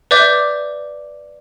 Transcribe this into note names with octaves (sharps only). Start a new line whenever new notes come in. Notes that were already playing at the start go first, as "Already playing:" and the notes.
B4 D5 E5 D6 G6